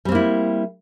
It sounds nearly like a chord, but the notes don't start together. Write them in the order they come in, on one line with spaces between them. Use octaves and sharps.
G3 C4 A#3 E4